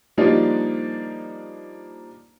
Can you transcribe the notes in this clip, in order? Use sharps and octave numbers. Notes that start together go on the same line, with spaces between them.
F3 G3 A#3 D4 D#4 F4